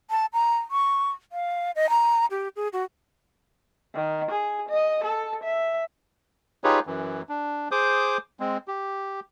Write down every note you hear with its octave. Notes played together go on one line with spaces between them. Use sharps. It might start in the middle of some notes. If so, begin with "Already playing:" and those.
A5
A#5
C#6
F5
D#5
A#5
G4
G#4
F#4
D#3
G#4
D#5
A4
E5
D#4 F4 G4 G#4 B4 C#5
F#2 E3
D4
G#4 C5 D6 D#6 G6
G#3 C4
G4